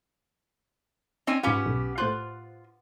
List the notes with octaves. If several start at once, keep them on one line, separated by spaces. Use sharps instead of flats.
C4 C#4 D#4 G#5
G#2 B3 C#4 F4 G4
B1
A2 F4 C5 F#6